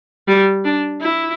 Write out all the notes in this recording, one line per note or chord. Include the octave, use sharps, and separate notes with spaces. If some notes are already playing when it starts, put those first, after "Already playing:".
G3
D4
E4